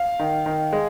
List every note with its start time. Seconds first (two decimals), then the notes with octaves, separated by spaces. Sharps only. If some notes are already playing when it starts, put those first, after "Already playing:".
Already playing: F5
0.19 D#3
0.46 D#3
0.73 G#3